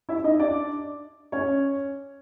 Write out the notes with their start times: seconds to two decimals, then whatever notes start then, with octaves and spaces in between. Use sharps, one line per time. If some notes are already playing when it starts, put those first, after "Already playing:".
0.09 E4 E5
0.24 D#4 D#5
0.40 D4 D5
1.32 C#4 C#5